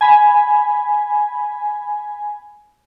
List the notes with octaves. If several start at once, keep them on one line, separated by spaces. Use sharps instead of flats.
G#5 B5